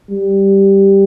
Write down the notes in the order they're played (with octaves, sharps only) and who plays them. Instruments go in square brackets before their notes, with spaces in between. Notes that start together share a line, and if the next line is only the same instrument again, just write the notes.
[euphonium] G3